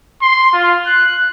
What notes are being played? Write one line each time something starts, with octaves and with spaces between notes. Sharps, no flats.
C6
F4
F#6